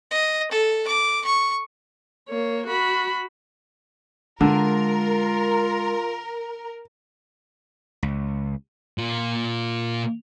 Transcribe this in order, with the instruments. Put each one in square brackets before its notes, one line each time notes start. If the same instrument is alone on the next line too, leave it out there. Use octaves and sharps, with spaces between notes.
[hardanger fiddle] D#5
A4
D6
C#6
[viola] A#3 C#5
F#4 B5
[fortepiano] D3 [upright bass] G#3 [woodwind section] F4 [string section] A#4
[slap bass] C#2
[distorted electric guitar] A#2 F4